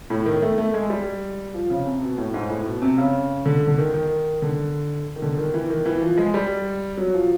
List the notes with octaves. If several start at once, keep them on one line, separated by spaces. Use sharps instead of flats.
A2
D#3
A3
A3
G#3
G3
F3
C#3
C3
B2
A2
G#2
A2
B2
C3
C#3
D3
D3
D#3
D#3
D3
D#3
D3
D#3
E3
D#3
E3
F3
G#3
G3
F#3
F3